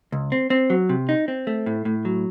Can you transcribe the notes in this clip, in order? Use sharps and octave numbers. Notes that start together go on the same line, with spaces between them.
C#2
C4
C4
F#3
C3
D#4
C4
A3
A2
A2
F#3